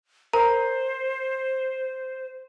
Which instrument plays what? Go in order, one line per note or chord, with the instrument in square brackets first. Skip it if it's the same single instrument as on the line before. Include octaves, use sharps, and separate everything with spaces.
[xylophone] A#4 A#5 [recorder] C5